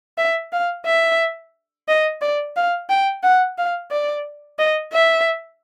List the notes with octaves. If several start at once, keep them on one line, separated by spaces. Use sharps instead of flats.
E5
F5
E5
D#5
D5
F5
G5
F#5
F5
D5
D#5
E5